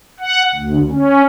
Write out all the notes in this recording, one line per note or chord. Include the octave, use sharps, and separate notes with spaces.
F#5
D2
C#4